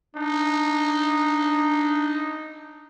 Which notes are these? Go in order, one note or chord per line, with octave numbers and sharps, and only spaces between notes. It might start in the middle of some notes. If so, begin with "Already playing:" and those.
D4 D#4